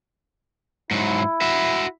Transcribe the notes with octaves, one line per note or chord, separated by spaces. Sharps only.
G#2 F#3 E4
F#4 E5